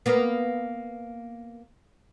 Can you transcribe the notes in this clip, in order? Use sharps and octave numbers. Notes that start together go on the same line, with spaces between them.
A#3 B3